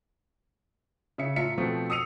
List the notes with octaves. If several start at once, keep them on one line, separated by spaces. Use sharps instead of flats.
C#3 E5 C#7
A2 F4 E5 A#5 B6 C#7
B2 F3 A3 C4 A4
D#6 E6 C7 C#7 D#7 F7